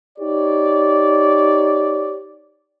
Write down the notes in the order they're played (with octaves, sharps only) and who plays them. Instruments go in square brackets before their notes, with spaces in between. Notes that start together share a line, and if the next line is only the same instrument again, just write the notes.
[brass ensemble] D#4 G4 C#5 D5